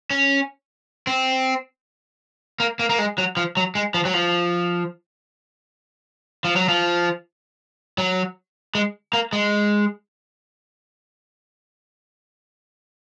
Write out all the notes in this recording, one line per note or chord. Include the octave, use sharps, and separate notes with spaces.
C#4
C4
A#3
A#3
A#3
G#3
F#3
F3
F#3
G#3
F3
F#3
F3
F3
F#3
F3
F#3
G#3
A#3
G#3